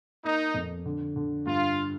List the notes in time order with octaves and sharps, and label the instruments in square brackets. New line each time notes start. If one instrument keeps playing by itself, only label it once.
[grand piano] A#3 [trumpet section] D#4
[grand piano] F2
D3
D3
[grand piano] G2 [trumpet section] F4